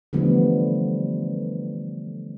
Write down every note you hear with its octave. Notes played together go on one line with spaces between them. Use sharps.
D3 E3 F3 G3 A3 B3